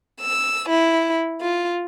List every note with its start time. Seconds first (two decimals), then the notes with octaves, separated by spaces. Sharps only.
0.21 E6
0.69 E4
1.41 F4